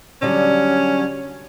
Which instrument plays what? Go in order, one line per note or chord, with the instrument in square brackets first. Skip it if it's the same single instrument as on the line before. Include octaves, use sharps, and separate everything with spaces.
[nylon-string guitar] D3 F#3 G3 [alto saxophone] C#4